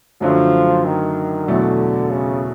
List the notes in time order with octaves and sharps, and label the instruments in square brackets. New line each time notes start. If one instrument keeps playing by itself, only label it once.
[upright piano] F#2 D3 F#3 A3 D4 [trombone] F3
[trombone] D#3
[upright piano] E2 B2 F#3 A3 [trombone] D3
[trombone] C#3